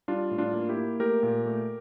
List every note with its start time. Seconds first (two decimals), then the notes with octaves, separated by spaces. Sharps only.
0.08 G3 D4 F4
0.31 A2
0.38 D4 F4
0.53 A#3
0.69 E4 G4
0.77 A#3
1.00 A3 G4 A#4
1.23 A#2
1.46 A3